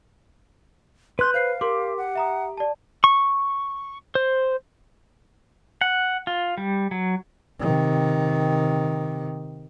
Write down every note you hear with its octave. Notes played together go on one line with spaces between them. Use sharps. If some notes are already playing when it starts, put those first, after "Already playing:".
B4 C6 F#6 G6
C5 F5 C7
G4 A#4 C6 D6
F#5
E5 A#5 D#6
D5 A5
C#6
C5
F#5
F4
G3
F#3
C3 D#3